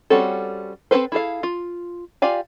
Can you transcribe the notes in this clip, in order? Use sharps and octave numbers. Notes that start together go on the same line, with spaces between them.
G3 C4 C#4 F#4 A4
C4 F4 A4 B4 C5
E4 G#4 A4 F5
F4
F4 G4 D5 F5 G#5